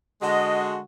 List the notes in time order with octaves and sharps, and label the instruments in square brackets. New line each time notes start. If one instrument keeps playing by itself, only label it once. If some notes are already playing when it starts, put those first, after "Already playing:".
[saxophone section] D3 G#3 [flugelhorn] F#4 [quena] D#5